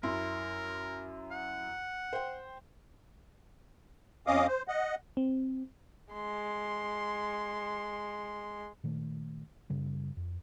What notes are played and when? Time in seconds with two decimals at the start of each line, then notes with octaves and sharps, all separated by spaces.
0.03 F#2 E4 A#4 C6
1.31 F#5
2.13 C5 G5
4.27 F2 C#4 D#5 F5 D6 D#6
4.48 C5
4.68 D#5 F#5
5.17 C4
6.13 G#3 C6
8.84 A#2 D#3 A3
9.70 F#2 C#3 G3
10.17 F2